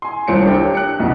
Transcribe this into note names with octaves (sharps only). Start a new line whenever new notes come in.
G#5 C6
D#1 C2 C5 C#5 C#7 D7
D4 G4 A#4 C#5 G5
F#6 C#7
B1 E2 C#3 E3